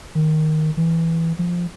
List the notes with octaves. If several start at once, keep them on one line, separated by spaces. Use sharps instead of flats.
D#3
E3
F3